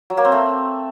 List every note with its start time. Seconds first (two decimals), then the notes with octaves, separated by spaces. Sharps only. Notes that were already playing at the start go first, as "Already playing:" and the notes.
0.10 F#3
0.17 A#3
0.25 C4
0.32 A3